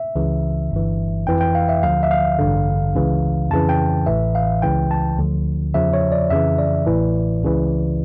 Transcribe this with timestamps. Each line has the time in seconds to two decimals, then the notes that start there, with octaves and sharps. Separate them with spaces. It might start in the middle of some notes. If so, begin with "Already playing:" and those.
Already playing: E5
0.16 C#2 C#3 E3
0.71 G1 G2 E3
1.27 F2 E3 G5
1.41 G5
1.55 F5
1.69 E5
1.83 D2 D3 F3 F5
2.03 E5
2.11 F5
2.38 A1 G2 D3
2.95 C#2 C#3 E3
3.51 F2 C#3 E3 A5
3.69 G5
4.06 A1 A2 E3 E5
4.35 F5
4.62 C#2 C#3 E3 G5
4.91 A5
5.18 D2 D3 F3
5.74 E2 C#3 F3 E5
5.93 C#5
6.12 D5
6.30 F2 C#3 E3 E5
6.58 D5
6.86 A1 A2 E3
7.43 C#2 C#3 E3